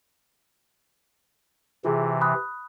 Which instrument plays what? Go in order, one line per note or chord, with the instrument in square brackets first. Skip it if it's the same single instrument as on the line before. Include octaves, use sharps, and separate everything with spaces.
[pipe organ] C3 E3 [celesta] F4 G#4
[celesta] B5 D#6 F#6